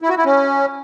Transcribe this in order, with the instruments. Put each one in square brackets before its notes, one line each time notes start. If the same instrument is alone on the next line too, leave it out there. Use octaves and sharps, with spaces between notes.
[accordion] E4
F#4
E4
C#4